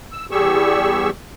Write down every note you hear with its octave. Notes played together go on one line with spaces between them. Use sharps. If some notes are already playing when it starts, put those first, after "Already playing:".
E6
E2 G3 G4 G#4 C#6 E6